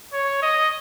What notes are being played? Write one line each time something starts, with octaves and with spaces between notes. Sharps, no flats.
C#5
D#5